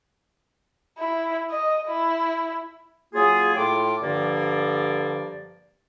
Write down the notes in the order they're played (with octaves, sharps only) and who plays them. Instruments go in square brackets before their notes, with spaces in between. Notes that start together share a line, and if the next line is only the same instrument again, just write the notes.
[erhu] E4
D#5
E4
[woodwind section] F#3 A#3 F4 G#4
A2 F4 G5 D6
G2 D3 F3 A#3 D5